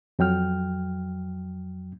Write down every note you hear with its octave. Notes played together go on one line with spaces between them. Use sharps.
F2 F#3 G5 F6